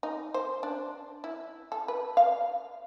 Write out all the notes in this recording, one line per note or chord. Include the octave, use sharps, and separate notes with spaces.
D#4
C5
D4
E4
A4
B4
F5